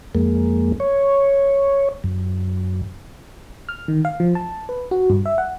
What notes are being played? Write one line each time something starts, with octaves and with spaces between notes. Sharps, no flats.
F2 G#3 A#3
C#5
F#2
F6
D#3
F5
F3
A5
B4
F#4
G2
E5
F#5